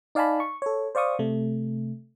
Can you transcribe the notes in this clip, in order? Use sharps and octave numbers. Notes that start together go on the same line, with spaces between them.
D#4 D5 F5 G#5 A5 B5
C#6
A4 C#5
C5 D5 F5 C#6 D#6
C3 A3